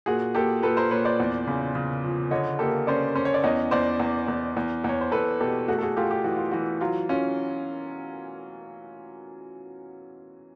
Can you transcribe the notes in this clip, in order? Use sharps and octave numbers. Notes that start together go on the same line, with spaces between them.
A#2 F#4 G#4
A#2 G4 A4
A#2 A4 B4
A#4 C5
A#2 B4 C#5
C5 D5
E2
C#3
C#3
F3
D3 C#5 D#5
A#3 G4 A4
C#4 C5 D5
C#4 C5
C#5
D5
E2 C#5 D#5
E2 C5 D5
E2
E2
E2
E2 C#5
C5
E2 A4 B4
B2 G4 A4
A3 F#4 G#4
A4
F#4 G#4
A3 F4 G4
G4
E3 F#4
F4
E3 F#4
F#3 F4
C#4 F4